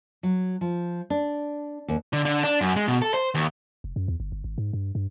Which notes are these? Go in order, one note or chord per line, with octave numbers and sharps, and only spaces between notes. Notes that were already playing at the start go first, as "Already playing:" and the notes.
F#3
F3
D4
D#2
D3
D3
D4
F#2
G#3
B2
A4
C5
D#2
F1
F#2
E2
G1
G1
G#1
G#2
G2
G2